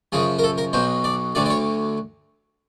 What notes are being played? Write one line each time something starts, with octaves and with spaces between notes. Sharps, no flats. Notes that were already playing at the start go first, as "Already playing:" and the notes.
F#2 C#3 F3 G#4
A#4
A4
A#4
B1 B2 F#3 C5
D5
D2 D3 F#3 D5
D5
C#5